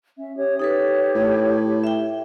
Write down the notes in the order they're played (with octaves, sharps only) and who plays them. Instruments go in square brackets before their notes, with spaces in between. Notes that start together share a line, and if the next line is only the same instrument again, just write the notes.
[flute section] C#4 E5
G4 C#5 D#6
[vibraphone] D#4 A4 B4 [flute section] G4 C#5
[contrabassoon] A2
[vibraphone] E5 G5